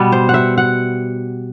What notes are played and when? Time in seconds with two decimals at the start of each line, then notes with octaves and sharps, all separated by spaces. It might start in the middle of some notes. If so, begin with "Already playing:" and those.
Already playing: B2 G3 B3
0.12 C5
0.29 F#5
0.34 E5
0.58 F#5